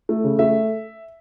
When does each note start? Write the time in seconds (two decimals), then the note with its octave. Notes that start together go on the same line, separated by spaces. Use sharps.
0.09 A3
0.24 C#3
0.39 A3 E5